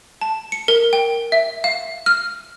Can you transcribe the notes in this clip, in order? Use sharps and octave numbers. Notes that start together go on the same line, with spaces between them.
A5
C#7
A#4
G5
E5
F5
F6